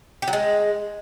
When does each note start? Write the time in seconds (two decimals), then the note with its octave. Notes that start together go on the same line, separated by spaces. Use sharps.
0.22 G4
0.28 F#3
0.33 G#3